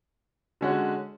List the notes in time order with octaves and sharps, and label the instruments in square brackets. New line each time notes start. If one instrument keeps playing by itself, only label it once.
[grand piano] D3 G#3 C#4 F#4